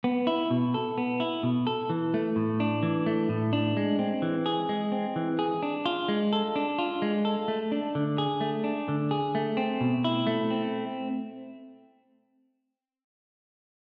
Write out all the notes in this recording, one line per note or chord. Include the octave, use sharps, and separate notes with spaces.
B3
E4
B2
A4
B3
E4
B2
A4
E3
A3
A2
D4
E3
A3
A2
D4
G#3
C4
E3
G#4
G#3
C4
E3
G#4
D4
F4
G#3
A4
D4
F4
G#3
A4
A3
D4
D3
G#4
A3
D4
D3
G#4
A3
C4
B2
E4
A3
C4